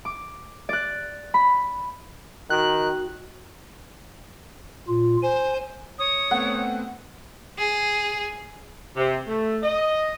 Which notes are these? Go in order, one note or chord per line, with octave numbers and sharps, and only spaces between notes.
D6
D5 F#6
B5
D#3 F#4 F#6
A#2 F4
C5 G#5
C#5 D#6
A3 B3 C4 F#5
G#4
C3
A3
D#5